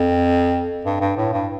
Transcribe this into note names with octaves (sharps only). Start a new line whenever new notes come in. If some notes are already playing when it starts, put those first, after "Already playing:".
Already playing: F2
G2
G2
A2
G2